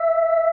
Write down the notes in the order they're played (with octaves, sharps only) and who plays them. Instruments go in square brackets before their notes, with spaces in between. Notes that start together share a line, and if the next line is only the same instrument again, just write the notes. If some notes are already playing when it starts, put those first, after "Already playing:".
Already playing: [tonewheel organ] E5